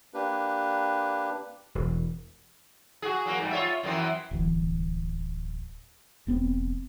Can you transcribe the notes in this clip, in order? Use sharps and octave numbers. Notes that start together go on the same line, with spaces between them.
A#3 D4 G4 B4
E1
F#4 G#4
F#3 A#3
G#2 G3
F4 C#5 E5
F#2 E3 C4
D1 G1 E3
E1 B3 C4